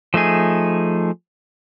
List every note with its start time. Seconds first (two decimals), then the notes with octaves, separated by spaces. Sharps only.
0.14 F3 A3 D#4 G#4